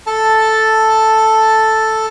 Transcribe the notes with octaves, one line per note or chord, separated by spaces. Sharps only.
A4 A5